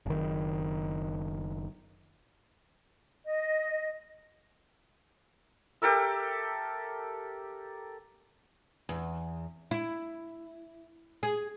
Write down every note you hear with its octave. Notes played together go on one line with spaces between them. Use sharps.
F#1 D#3
D#5
G4 A4 A#4 E5
E2
E4
G#4